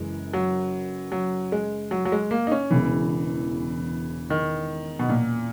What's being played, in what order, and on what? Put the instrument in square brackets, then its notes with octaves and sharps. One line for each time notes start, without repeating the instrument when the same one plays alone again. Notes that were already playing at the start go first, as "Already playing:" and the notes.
Already playing: [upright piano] F#1 F#2 E3 [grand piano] G#3
[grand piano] F#3
F#3
G#3
F#3
F#3
G#3
A#3
D#4
C#4
[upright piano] E1 E2 C#3 G#3 [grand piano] E3
[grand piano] D#3
B2
A#2